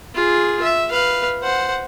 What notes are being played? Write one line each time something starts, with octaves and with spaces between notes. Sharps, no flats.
F4 G#4
E5
B4 F5
C5 F#5